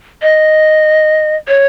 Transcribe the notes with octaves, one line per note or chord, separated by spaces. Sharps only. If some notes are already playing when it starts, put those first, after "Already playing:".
D#5
C#5